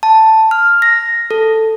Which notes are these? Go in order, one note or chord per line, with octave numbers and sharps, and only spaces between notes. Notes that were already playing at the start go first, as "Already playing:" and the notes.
A5
F6
A#6
A4